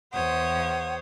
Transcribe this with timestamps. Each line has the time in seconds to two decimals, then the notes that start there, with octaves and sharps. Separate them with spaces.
0.13 E2 C5 C#5 F#5 D#6